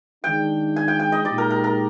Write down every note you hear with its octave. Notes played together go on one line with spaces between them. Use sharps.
D#3 G#3 D4 G5
G#5
G5
G5
D#5
A#2 G#3 D#4 G4 D5
A#4
A#4
A#4